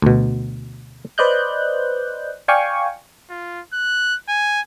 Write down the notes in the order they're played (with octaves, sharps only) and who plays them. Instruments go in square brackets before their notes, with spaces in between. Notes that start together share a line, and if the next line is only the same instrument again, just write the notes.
[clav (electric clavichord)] D2 B2
[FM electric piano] B4 C5 D5 D#5 F#6 G6
D5 F5 G5 G#5 C#6
[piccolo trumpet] F4
F#6
G#5